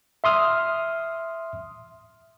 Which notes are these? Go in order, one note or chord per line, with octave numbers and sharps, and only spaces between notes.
E5 C6 D#6 F6